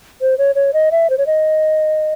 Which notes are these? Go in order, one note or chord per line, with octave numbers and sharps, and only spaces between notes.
C5
C#5
C#5
D#5
E5
C5
C#5
D#5